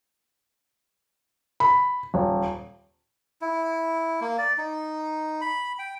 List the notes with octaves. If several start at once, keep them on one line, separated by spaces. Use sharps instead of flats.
B5
D#1
E4
A#3
D5
D#4
B5
G5